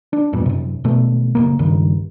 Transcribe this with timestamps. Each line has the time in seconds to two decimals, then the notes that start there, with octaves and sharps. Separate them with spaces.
0.13 D4
0.33 E2 G2 A#2
0.46 F#2 C3
0.84 G#1 B2 A3
1.35 F#1 C#2 A#3
1.59 C#2 G2 D#3